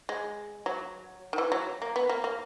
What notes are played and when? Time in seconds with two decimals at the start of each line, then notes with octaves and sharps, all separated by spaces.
0.09 G#3
0.66 F#3
1.33 D#3
1.38 E3
1.52 F#3
1.82 A#3
1.96 B3
2.09 A#3
2.24 A#3